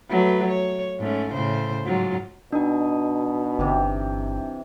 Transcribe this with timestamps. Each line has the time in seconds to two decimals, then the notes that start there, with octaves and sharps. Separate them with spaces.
0.10 F#3 A3 B4
0.48 C#5
1.00 G#2 A3 C#4
1.34 A2 C#3 C5
1.85 G#2 F#3 F4
2.53 B2 D4 D#4 D#5 G#5
3.59 G1 C3 E3 G4